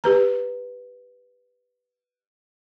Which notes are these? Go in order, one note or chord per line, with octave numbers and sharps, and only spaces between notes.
G4 B4 A#5